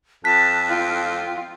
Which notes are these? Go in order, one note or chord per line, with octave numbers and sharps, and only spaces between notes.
F2 A5 F#6 B6
F4 G5